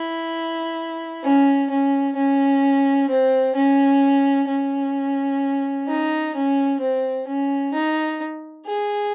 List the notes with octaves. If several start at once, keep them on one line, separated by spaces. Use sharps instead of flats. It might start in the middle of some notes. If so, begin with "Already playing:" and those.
Already playing: E4
C#4
C#4
C#4
C4
C#4
C#4
D#4
C#4
C4
C#4
D#4
G#4